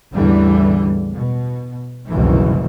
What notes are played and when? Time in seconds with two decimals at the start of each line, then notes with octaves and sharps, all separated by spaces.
0.14 A1 E2 D3 E3 G3
1.12 B2
2.08 F#1 C2 B2 D#3 E3